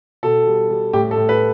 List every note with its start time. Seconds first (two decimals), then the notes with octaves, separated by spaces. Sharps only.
0.23 B2 A4
0.47 G3
0.70 G3
0.93 A2 G4
1.11 A4
1.17 A2
1.29 B4